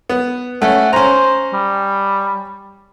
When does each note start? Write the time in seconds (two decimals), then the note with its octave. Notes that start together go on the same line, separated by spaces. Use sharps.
0.09 B3
0.62 A3 C#4 F#5
0.93 C#4 C5 A#5
1.54 G3